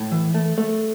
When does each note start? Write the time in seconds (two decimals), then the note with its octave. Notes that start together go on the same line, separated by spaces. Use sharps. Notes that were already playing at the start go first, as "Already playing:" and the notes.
Already playing: A2
0.12 E3
0.34 A3
0.58 A3